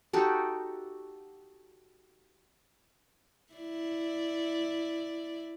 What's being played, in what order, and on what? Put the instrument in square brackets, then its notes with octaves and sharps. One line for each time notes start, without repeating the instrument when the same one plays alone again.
[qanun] D#4 F#4 G4 A4
[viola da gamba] E4 D5